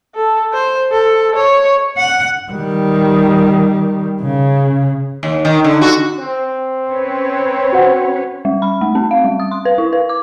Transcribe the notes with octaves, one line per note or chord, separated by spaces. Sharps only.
A4
C5
A4
C#5
F#5
D#3 G3
C#3
D#2
D#3
D3
F#4
C4
C#4 B4 C#5
F#4 C5 F#5
G3
B5
A3
C4
F5
G3
D#6
C6
B4
E4
B4
D6